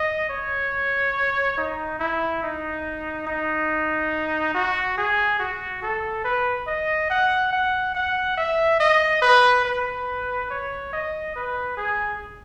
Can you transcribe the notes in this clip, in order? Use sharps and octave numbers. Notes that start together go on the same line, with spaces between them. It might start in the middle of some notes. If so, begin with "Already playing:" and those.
Already playing: D#5
C#5
D#4
E4
D#4
D#4
F#4
G#4
F#4
A4
B4
D#5
F#5
F#5
F#5
E5
D#5
B4
B4
C#5
D#5
B4
G#4